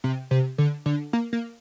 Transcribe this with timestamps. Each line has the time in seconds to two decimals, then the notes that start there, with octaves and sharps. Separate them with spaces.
0.04 C3
0.31 C3
0.58 D3
0.86 D3
1.13 A#3
1.33 A#3